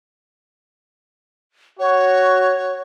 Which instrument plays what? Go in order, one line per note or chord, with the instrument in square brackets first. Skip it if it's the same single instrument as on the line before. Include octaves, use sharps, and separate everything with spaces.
[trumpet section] F#4 [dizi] C#5